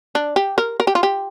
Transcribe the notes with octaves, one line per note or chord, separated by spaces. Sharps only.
D4
G4
A#4
A#4
G4
F4
G4